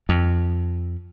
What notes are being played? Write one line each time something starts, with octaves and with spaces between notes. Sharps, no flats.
F2